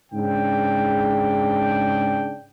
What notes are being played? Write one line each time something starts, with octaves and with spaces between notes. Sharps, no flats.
G#2 C#3 D4 G5